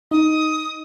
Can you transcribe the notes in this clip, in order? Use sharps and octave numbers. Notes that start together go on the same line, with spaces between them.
D#4 D#6